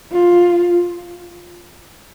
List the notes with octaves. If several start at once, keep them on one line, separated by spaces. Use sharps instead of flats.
F4